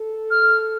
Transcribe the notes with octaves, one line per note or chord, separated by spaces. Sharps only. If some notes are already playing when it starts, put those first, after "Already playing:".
Already playing: A4
F6